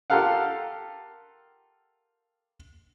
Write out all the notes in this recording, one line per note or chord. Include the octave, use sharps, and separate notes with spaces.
F4 G4 A4 A#4 F5 F#5